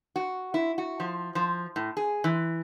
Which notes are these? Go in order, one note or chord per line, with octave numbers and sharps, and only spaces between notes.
F#4
E4
F#4
F3
F3
A2
G#4
E3